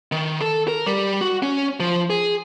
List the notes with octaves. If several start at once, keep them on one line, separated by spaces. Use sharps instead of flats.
D#3
A4
A#4
G3
F#4
C#4
F3
G#4